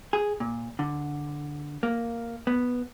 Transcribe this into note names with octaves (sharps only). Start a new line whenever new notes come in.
G#4
A#2
D3
A#3
B3